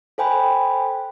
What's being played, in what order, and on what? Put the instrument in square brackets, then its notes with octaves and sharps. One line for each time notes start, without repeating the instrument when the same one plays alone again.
[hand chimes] A4 C5 G5 G#5 B5